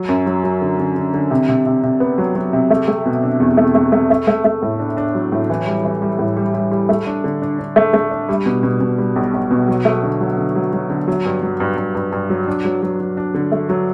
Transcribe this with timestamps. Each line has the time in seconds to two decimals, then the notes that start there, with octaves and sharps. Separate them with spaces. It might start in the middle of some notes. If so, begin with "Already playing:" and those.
Already playing: F#3
0.09 F#2
0.26 F#3
0.44 F#3
0.61 D3
0.79 D3
0.96 D3
1.14 D3
1.31 C3
1.49 C3
1.66 C3
1.83 C3
2.00 B3
2.18 F#3
2.35 F#3
2.53 C3
2.70 A3
2.88 A3
3.06 B2
3.23 D4
3.40 E2
3.57 A3
3.75 A3
3.92 A3
4.10 A3
4.27 A3
4.44 A3
4.62 A2
4.79 D4
4.97 D4
5.15 F#3
5.32 A2
5.50 E3
5.67 G3
5.84 E3
6.02 G3
6.19 A2
6.37 G3
6.54 G3
6.71 G3
6.89 A3
7.07 D4
7.24 D3
7.42 D4
7.59 D4
7.76 A3
7.93 A3
8.11 D4
8.29 G3
8.46 B2
8.63 B2
8.81 B2
8.98 G3
9.16 B1
9.34 B1
9.51 B2
9.68 F#3
9.85 A3
10.03 D3
10.21 F#3
10.38 D3
10.55 F#3
10.73 F#3
10.90 D3
11.07 F#3
11.25 G2
11.42 F#3
11.60 G2
11.77 G2
11.95 G2
12.12 G2
12.30 F#3
12.48 D4
12.65 F#3
12.82 F#3
13.00 F#3
13.17 D4
13.34 D3
13.52 A3
13.69 F#3